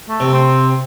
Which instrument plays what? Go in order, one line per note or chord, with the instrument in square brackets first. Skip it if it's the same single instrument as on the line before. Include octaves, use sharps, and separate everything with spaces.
[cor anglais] A3
[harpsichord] C3
[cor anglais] C4